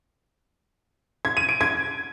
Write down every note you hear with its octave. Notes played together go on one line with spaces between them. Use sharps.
G#6
D#7
D7
G#6